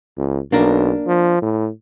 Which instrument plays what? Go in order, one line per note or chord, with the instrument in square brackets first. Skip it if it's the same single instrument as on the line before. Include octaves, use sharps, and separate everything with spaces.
[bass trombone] C#2
[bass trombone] B1 [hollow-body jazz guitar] A#3 D4 A#4
[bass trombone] F3
A2